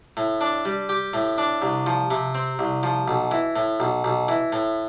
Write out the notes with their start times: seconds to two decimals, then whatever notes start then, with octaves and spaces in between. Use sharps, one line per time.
0.17 A2
0.41 D4
0.65 G3
0.89 G4
1.14 A2
1.38 D4
1.62 C2
1.86 F3
2.10 C3
2.35 C4
2.59 C2
2.83 F3
3.08 B1
3.31 E3
3.56 A2
3.80 B1
4.04 B1
4.28 E3
4.52 A2